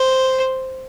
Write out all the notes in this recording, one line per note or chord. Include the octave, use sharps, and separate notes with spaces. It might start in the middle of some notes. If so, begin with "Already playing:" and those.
Already playing: C5